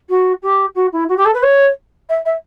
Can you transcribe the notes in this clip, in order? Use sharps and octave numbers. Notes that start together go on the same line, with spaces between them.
F#4
G4
F#4
E4
F#4
G4
A4
B4
C#5
E5
E5